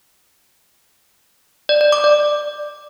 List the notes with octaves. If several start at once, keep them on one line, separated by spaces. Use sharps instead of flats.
D5
D5
D6
D5